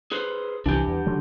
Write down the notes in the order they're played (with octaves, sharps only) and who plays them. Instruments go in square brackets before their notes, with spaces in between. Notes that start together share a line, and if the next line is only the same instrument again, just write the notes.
[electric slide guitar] G#4 B4 C5
[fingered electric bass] C2 E3 [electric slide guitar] D4 G4
[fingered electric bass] E2
D3 F#3 G#3